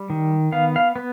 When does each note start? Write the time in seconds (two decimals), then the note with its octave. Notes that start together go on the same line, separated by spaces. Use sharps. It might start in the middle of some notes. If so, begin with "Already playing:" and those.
Already playing: G3
0.10 D#3
0.52 B3 F5
0.76 F5
0.96 B3